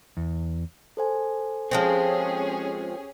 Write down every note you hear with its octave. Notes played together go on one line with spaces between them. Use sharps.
E2
A4 C5 G#5
F3 G#3 C4 C#4 G4 G#4